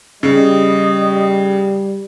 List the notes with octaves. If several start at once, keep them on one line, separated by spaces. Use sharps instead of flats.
C#3 G3 D#5